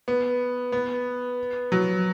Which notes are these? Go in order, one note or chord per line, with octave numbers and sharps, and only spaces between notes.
B3
B3
F#3